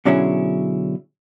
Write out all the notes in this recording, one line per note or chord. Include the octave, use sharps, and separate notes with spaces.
B2 D3 F#3 C#4 E4 G#4